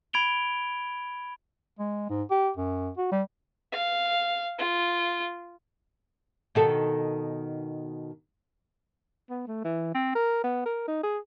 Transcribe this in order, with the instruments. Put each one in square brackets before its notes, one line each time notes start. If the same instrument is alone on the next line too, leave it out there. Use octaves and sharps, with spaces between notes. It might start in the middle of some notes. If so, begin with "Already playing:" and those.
[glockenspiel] B5 G#6 D7 F7 G7
[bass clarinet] G#3
G#2
G4
F#2
F#4
G3
[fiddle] F5
F4
[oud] B2 D#3 A4
[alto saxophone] B3
A3
E3
C4
A#4
B3
A#4
D#4
G#4